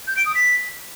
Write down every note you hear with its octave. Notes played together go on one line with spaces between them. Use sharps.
G6
D7
D#6
B6